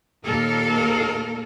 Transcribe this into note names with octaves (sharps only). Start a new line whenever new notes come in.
D#2 A#2 A#3 A4 A#4